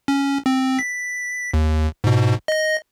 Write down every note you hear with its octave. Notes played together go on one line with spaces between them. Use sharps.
C#4
C4
B6
D#2
G#2 B2
D#5 A#6